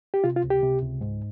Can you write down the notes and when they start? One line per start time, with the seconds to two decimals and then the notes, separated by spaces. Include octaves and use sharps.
0.14 G4
0.24 C3 F4
0.36 F4
0.44 C#2
0.50 G4
0.63 C3
0.83 C#2
1.01 G#2